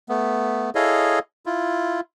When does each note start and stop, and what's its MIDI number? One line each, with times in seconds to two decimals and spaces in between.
0.09 0.70 57
0.09 0.70 59
0.75 1.19 64
0.75 1.19 68
0.75 1.19 69
0.75 1.19 73
0.75 1.19 75
0.75 1.19 77
1.46 2.00 64
1.46 2.00 65